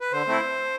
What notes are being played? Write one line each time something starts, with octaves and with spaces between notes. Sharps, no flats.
B4
D3 C5
A3 C4 E4